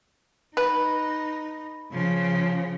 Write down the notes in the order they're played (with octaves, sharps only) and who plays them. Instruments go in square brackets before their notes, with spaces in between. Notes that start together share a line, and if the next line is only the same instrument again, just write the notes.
[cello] D#4 [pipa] B4
[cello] C#3 F3